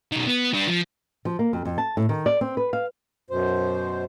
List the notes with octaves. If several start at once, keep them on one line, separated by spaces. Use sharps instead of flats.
B2 D#3
B3
G3 D4
F3
F3
A#3
F2
F2
A5
A2
D#3
D5
C4
B4
F5
F#2 B2 C5